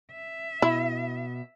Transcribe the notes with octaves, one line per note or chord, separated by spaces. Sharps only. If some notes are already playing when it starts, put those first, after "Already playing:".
E5
B2 E4